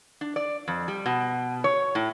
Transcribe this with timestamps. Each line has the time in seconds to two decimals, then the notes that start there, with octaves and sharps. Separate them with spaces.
0.21 D4
0.36 D5
0.68 F2
0.88 G3
1.06 B2
1.64 C#5
1.95 A2